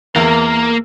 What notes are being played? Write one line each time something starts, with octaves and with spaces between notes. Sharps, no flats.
E2 A#3 A#4